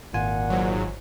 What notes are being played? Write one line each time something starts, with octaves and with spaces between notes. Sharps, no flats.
G#1 A#2 F4 F#5 G#5
G#2 F#3